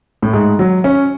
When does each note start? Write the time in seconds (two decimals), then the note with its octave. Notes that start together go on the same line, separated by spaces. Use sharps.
0.23 A2
0.33 G#2
0.59 F#3
0.84 C#4